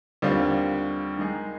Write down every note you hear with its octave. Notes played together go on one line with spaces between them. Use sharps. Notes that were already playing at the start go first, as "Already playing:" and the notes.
D#2 D3 G3 C4 F4
D#3 G#3 D#4 G#4